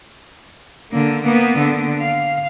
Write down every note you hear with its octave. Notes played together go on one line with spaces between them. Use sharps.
D3 A#3
A#3 B3
D3
F5